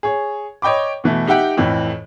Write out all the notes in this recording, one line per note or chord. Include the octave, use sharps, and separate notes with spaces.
G#4 C#5
C#5 D#5 G5 B5 D6
B2 E3 A3
D#4 G4 E5 F#5 G5
F2 A2 E3